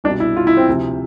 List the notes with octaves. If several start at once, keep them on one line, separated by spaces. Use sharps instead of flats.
C2 B2 D4
E4
F4
E4
C4
D2 C3 F3